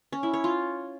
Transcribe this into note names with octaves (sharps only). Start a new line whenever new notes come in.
C#4
E4
C#5
F4